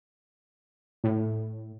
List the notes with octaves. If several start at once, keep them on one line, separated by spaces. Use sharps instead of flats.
A2